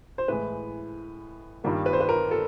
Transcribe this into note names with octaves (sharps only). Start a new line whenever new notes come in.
C5
A2 E3 G#3 B4
G2 D#3 G3 A#3
B4
C5
B4
A#4
A4